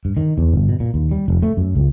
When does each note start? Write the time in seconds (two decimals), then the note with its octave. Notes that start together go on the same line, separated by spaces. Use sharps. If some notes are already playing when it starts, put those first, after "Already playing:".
0.05 G2
0.17 D#3
0.38 E2
0.53 G1
0.69 B2
0.80 A#2
0.94 D#2
1.11 G3
1.28 F1
1.42 A3
1.57 F#2
1.75 C#2